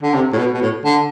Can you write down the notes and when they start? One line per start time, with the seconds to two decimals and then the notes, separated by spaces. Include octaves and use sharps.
0.03 D3
0.14 C3
0.33 A2
0.38 B2
0.54 B2
0.62 A2
0.85 D3